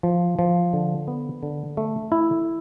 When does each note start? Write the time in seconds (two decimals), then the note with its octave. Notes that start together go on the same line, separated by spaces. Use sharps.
0.03 F3
0.39 F3
0.73 D3
1.08 B3
1.43 D3
1.77 A3
2.12 E4